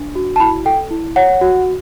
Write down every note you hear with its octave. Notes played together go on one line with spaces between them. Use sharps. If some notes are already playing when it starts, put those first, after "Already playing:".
Already playing: D4
F#4
A5
E4 B5
A4 G5
E4
C#5 F#5
F#4